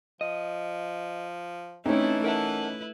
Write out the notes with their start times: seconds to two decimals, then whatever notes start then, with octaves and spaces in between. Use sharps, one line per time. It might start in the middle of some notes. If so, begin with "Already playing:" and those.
0.21 F3 D#5
1.86 E3 A3 C4 C#4 D#4 E4 A4
2.24 E4 A#4 B4 F#5 A5